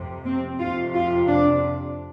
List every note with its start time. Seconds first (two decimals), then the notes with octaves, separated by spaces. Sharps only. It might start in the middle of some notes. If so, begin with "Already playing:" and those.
Already playing: F2 C3
0.26 C4
0.59 F2 C3 F4
0.94 F4
1.27 D4